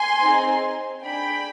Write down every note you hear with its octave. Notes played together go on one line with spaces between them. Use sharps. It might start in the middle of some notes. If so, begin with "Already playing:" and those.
Already playing: G#5 C6
C4 D#4 G#4
D4 G#4 G5 B5